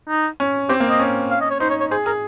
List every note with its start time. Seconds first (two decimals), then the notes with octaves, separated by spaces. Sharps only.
0.09 D#4
0.40 C#4
0.69 C4 G4
0.80 A#3
0.89 D#5
1.00 C#4
1.31 F5
1.41 D#5
1.51 C#5
1.60 D#4 C5
1.70 C#5
1.80 C#5
1.91 G#4 C5
2.06 G#4 A#4